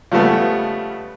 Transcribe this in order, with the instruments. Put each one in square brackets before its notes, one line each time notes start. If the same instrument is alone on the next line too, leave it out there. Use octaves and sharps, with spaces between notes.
[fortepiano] C#3 F3 G3 A3 B3